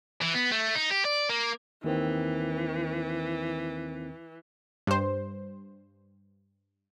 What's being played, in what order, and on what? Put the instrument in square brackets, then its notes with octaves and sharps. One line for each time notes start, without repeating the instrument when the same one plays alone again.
[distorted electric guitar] E3
B3
A3
D#4
G4
D5
A#3
[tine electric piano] D#2 D#3 C4 [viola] E3
[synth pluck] G2 C5